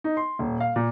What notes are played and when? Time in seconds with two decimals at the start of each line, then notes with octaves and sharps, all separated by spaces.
0.04 D#4
0.17 C6
0.39 D#1
0.60 F5
0.76 A#2